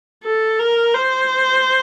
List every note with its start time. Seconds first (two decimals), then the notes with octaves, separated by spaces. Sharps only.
0.24 A4
0.59 A#4
0.95 C5